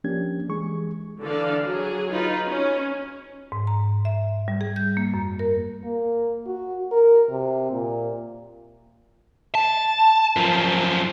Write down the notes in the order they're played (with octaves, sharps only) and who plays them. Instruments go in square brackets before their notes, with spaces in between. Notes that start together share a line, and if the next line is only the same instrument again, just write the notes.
[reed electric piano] F3 A#3 C#4 D4 G4 G#6
E3 G#3 G#4 C#6
[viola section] D3 E3 D4 A4 F5
F#3 G#4
D#4 F4 B4
C#4
[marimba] G#2
A#5
E5
G3
G#4
G6
A#3
F#2
A#4
[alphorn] A#3
F#4
A#4
C3
A#2
[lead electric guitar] A5
F#2 F3